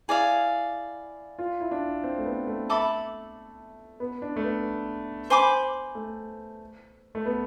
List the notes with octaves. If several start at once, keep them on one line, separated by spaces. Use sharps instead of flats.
E4 G#4 D5 F5
F4
E4
D4
C4
A3
B3
A3
A4 E5 B5 D6
B3
D4
A3
B3
C5 G#5 B5 D6
A3
A3
B3